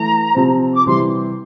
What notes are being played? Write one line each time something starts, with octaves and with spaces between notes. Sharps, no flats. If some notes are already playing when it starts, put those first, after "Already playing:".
Already playing: E3 A3 A#5
C3 F3 C4
D6
C3 E3 G3 C4 E4 C6